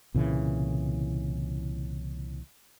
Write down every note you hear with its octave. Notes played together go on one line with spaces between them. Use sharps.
C2 A#2 C#3 E3